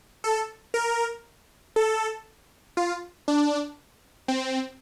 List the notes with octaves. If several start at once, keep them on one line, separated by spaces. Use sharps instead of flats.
A4
A#4
A4
F4
D4
C4